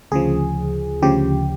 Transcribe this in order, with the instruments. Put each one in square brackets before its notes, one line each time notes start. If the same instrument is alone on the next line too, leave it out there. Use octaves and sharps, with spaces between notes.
[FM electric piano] D2 C#3 F3 G#4
D2 C#3 F3 G4